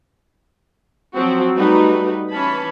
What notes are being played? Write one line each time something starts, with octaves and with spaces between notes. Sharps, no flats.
F3 F#3 C4 F#4
G3 A3 D#4 F#4 B4
E3 C#4 A5 B5